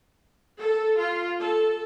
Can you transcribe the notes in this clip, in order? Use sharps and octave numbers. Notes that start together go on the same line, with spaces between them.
A4
F4
A4